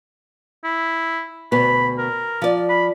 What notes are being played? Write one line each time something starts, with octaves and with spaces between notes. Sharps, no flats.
E4
D2 B2 B3 B5
A#4
F3 D5
B5